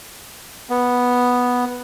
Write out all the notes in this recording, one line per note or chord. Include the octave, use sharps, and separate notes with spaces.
B3